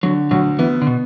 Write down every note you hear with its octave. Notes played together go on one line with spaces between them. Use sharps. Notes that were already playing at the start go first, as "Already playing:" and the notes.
D3 F#3
D2 F#3
E3 B3
D3
B2